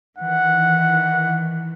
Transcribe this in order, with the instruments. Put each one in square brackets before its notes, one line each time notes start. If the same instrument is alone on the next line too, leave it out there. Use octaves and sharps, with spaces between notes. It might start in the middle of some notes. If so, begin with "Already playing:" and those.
[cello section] D#3 E3 [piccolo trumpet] F#5